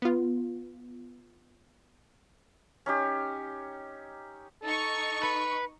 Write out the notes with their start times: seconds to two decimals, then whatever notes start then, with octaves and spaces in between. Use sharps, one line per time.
0.02 B3 F4
2.86 C#4 D#4 G4
4.63 D#4 A4 C#6
5.23 B4